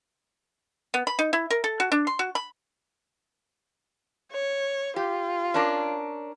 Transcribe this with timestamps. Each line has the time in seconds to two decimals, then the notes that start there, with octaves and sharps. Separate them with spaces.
0.94 B3
1.07 B5
1.19 D#4
1.33 E4
1.50 A#4
1.64 A4
1.80 F#4
1.92 D4
2.07 C6
2.19 F#4
2.35 B5
4.32 C#5
4.96 F4 G4
5.54 C#4 D4 A#4